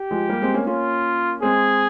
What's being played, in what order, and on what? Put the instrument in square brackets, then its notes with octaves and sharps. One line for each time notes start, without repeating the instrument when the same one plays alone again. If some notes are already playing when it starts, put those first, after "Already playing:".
Already playing: [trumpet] G4
[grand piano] F3 G#3
G3 A#3
G#3 C4
A#3 C#4
[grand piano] A#3 C#4 [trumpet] F4
[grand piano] G#3 C4 [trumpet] G#4